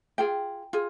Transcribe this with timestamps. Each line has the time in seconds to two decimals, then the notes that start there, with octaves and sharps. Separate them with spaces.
0.18 F4 G#4 G5
0.73 F4 G#4